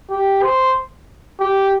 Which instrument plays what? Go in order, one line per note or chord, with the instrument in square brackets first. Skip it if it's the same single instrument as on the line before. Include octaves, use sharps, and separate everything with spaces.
[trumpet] G4
C5
G4